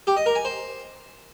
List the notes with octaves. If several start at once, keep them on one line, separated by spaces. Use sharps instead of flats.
G4
D#5
A#4
G#5
C5